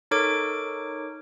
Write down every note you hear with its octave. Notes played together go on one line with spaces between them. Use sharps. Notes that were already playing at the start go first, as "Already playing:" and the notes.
D#4 A4 A#4 C#5 D6 D7